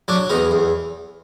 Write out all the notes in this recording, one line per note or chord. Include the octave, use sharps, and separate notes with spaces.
F#3 D4
E2 D#4
E2